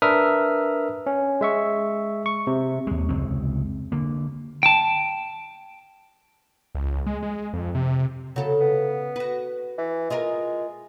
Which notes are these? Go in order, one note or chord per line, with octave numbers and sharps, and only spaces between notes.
D4 A#4 B4 E5 D#6 F6
C#4
G#3 E5 C#6
C#6
C3
D#2 G#3
F1 C#2 G#3 C4
D3 A#3
G5 A5
C#2
G#3
G#3
F2
C3
C#3 F#3 A4
B3
F#4 B4
E3
G#3 F4 G#4 A#4